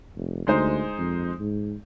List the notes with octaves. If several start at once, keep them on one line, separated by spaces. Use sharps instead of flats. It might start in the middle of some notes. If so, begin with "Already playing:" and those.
F1
D2 G#3 D#4 C5
F2
G#2